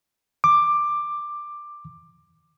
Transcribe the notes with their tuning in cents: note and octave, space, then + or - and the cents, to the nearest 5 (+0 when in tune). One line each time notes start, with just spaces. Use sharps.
D6 +10